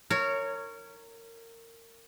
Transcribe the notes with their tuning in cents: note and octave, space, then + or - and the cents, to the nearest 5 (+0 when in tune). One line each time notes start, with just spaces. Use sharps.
A#4 -25 C#5 +0